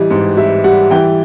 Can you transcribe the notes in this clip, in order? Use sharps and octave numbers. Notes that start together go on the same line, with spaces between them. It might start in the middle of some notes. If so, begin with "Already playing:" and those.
Already playing: A1 E3 G3 D#5
G#2
G3 E5
G3 F#5
E3 G5